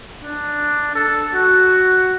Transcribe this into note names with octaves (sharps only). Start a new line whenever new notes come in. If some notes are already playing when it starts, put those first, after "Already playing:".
D4
A4
F#4